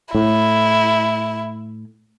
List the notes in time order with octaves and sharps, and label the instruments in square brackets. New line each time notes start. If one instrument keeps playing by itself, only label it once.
[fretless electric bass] A2 [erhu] E4